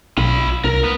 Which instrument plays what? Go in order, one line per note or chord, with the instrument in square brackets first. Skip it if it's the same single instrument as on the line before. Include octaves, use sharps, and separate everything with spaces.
[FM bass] B1 [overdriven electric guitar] F4 B5
[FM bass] C2 [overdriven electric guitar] A#4
[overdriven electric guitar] B3